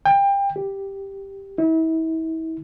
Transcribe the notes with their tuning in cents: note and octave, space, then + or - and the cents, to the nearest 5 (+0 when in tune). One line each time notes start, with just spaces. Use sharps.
G5 +25
G4 +0
E4 -35